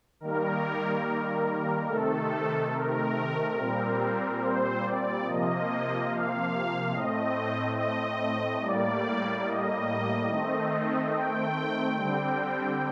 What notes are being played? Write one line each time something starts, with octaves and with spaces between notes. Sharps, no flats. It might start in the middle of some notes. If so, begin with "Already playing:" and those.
D#3 G3 A#3 A#4
C3 D#3 A3 A4
A#4
A#2 G3 C4
C5
D5
C3 F3 A#3 D#5
F5
A2 A3 C4 D#5
D#5
A2 G3 A#3 D5
D#5
D#3 A3 C4
G5
D3 G3 C4